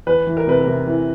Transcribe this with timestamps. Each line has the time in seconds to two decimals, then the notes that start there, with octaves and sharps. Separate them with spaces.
0.06 E2 B4
0.27 E3
0.37 A#4
0.47 C3 B4
0.61 A#4
0.67 C3
0.87 E3